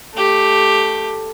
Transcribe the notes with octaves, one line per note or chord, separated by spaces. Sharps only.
A3 G4